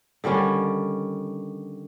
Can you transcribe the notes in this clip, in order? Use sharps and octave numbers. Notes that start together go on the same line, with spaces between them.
D3 D#3 G3 C#4